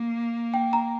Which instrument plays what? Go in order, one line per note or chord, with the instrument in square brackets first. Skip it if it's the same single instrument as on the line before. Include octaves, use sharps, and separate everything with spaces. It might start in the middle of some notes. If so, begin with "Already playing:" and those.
Already playing: [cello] A#3
[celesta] G5
A#5